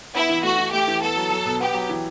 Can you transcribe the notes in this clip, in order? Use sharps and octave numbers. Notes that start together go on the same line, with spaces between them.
B3 E4
E3
A3 F#4
E3
A3 G4
E3
B3 A4
F#3
F#3
B2
B3 G4
F#3
E3